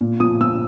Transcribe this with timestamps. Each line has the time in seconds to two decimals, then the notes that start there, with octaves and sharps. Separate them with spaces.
0.01 A#2
0.20 F3 D#6
0.41 F3 E6